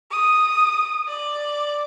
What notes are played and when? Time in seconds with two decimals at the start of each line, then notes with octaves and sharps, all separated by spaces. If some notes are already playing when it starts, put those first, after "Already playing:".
0.11 D#6
1.08 D5